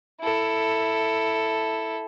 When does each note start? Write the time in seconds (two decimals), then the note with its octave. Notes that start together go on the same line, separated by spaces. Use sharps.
0.21 E4 A4